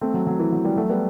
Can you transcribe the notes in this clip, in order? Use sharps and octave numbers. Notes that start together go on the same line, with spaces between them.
A3 C4
F#3
F#3
E3
F#3
E3 G3
F#3 A3
G3 B3